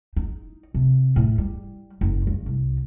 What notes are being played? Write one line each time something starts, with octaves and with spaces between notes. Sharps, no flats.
D#4
C3
A2
G3
F#1
G2
C2